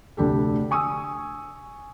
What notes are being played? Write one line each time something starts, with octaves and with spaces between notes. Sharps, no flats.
F1 D2 D4 G4 A4
G#5 C#6 D#6 E6